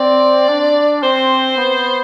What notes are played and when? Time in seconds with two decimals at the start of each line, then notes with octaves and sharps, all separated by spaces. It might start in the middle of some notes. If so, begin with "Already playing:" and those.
Already playing: C4 D5
0.48 D4
1.03 C4 C5
1.57 B3